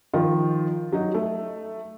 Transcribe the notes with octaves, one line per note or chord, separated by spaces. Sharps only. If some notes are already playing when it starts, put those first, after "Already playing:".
D#3 F3 F4
F#3 D#4
A3